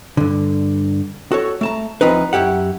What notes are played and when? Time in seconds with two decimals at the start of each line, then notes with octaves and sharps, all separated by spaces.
0.17 G2 D3
1.32 F#4 A4 C#5
1.61 A3 A5 A#5
2.01 D2 F3 C4 D#4 B4
2.33 F#2 B2 E4 G4 F#5